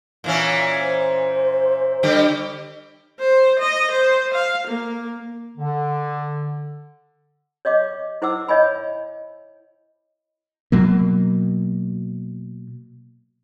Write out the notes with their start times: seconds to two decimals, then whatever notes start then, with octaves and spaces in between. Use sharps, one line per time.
0.24 A#2 E3 C#4
0.78 C5
2.03 D3 G3 G4
3.20 C5
3.59 D#5
3.91 C5
4.34 F5
4.67 A#3
5.58 D3
7.65 C#5 D#5 F5 D6
8.22 E4 C5 F#5 D6 E6
8.49 C#5 D#5 E5 G#5 B5
10.72 B2 F#3 A#3